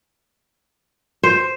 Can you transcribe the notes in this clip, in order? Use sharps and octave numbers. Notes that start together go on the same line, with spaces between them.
C5